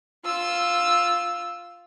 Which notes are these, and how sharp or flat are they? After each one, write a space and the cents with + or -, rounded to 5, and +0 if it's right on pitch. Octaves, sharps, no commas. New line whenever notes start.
F4 +0 E6 +0